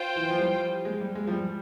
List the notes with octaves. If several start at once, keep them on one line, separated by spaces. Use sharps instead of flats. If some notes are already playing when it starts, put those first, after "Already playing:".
Already playing: F4 C5 G5
E3
F3
G3
G#3
G3
G#3
F3
G3